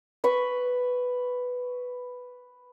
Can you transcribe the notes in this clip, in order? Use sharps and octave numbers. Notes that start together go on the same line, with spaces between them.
B4 B5 C#6